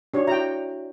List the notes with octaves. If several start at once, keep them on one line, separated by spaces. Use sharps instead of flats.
D4 D#4 F#4 G4 C#5
E4 F#4 E5 G5 A#5